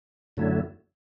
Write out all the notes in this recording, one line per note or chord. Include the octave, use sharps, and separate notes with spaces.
F#2 D3 F#3 A3 E4